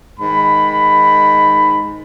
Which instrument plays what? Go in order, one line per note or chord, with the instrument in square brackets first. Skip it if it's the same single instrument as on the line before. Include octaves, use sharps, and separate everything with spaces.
[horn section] G#2 D#3 B5